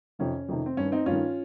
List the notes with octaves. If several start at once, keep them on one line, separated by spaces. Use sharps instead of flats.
F2 C3 D#3 C#4
F2 C3 D#3
C4
G2 D#3 C#4
C4 D#4
G2 C#4 F4
D#3